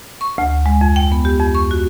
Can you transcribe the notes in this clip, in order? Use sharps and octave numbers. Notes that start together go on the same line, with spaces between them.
C#6
D2
G#3
F2
G5
B3
G4
F2
C#6
F#4